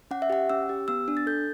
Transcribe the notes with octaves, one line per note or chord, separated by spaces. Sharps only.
C#4 F#5
E5
G4 F#5
C#4 E6
G4
B3 E6
D4
A6
A4 G6